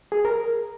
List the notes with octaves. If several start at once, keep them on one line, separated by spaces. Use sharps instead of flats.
G#4
A#4